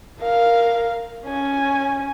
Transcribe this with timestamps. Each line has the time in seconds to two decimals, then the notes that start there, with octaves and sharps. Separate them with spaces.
0.20 A#4 F5
1.26 C#4 G#5